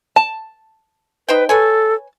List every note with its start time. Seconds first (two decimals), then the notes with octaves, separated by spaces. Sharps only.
0.16 A5
1.29 D#4 B4 C5 G5
1.49 A4 B4 C#5 G#5